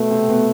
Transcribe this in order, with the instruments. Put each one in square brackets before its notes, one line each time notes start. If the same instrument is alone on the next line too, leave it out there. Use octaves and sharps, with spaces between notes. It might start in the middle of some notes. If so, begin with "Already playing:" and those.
Already playing: [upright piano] B2 B3 [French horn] A3
[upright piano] C3 C4
B2 B3